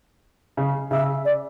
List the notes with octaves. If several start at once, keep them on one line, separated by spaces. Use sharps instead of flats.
C#3
C#3 E5
D5